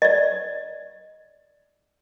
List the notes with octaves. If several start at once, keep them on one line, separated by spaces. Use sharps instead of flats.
D5 D#5